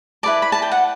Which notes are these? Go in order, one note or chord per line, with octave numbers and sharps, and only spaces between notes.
E4 B4 D5 A5
B5
A5
G5
F#5